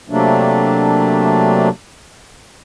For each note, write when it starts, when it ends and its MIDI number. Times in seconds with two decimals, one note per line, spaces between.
0.10 1.69 48
0.10 1.69 54
0.10 1.69 57
0.10 1.69 58
0.10 1.69 62